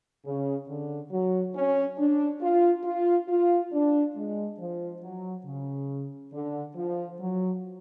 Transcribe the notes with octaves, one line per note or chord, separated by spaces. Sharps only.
C#3
D3
F#3
C#4
D4
F4
F4
F4
D4
G#3
F3
F#3
C#3
D3
F3
F#3